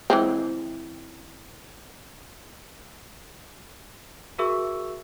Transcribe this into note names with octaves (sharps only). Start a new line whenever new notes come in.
E3 G#3 C4
F#4 G#4 A#4 E5 C#6 E6